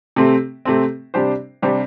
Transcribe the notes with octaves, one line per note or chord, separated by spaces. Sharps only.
C3 A3 C4
C3 A3 C4
C3 G3 D4 G4 C5
C3 G3 D4 G4 C5